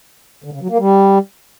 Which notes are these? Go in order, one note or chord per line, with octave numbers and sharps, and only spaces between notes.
D3
C#3
F#3
A#3
G3